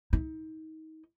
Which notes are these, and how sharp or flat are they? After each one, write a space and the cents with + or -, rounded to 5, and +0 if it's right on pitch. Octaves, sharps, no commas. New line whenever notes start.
D#4 +30